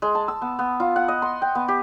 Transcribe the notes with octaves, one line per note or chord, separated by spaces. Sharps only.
G#3
A5
E6
B3
B3
F4
F#5
D#5
C6
G5
B3
G4